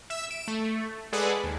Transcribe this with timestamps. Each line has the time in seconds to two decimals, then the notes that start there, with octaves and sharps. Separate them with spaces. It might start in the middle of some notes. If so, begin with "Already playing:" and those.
0.10 E5 E6 E7
0.29 D7 E7
0.48 A3
1.12 G#3 G#4 A4 B4 D5 F#5
1.44 D#2